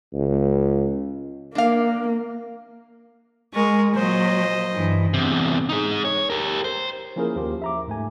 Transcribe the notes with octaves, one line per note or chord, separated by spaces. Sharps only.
C#2
A#3 D4 F5
G#3 A#4 C#6
A#2 F#3 C5 D#5
G2 E3
E2 C3
D#4 G#4
C#5
G4 A#4
C5
F3 A#3 C#4 E4 G#4 A#4
D#2 F3 F4 G4
E5 A#5 D6
G#2 A3 G#5